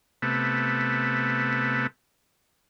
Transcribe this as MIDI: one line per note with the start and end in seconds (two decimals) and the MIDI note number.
0.22 1.87 48
0.22 1.87 57
0.22 1.87 59